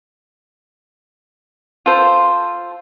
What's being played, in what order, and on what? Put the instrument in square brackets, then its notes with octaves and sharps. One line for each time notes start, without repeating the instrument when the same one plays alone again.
[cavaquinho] F4 A4 C5